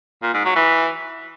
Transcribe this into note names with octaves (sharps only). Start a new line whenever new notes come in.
A#2
G#2
F#3
E3